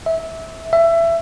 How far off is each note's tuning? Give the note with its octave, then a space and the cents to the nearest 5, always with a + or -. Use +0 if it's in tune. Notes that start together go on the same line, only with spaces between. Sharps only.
E5 -20
E5 +20